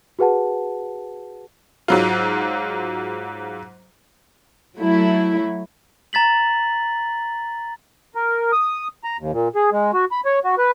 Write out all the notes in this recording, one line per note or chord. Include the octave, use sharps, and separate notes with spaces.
F#4 G#4 B4 F#5 A5
G#2 F#3 F4
F#3 A3 E4
A#5 A6 B6 F#7
A#4
D#6
A#5
D#2
A#2
G#4
G#3
F#4
B5
C#5
F#4
B4